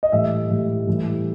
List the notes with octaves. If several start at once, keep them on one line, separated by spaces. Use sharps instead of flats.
D#5
A2 E3 G3 E5
A2 E3 G3
A2 E3 G3